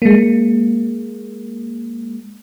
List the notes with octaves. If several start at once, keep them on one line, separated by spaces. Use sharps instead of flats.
G#3 A#3